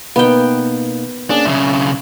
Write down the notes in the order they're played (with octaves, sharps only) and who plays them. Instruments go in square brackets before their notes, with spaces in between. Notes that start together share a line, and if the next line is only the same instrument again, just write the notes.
[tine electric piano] B2 A#3 D#4 [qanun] B3 G5
[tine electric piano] A#3 C#4 G#4 [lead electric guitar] D4
[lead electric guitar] B1 C#3 [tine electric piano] E5